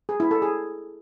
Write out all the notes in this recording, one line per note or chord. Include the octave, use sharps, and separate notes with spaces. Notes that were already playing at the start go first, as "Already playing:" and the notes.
G#4
E4
A4
G#4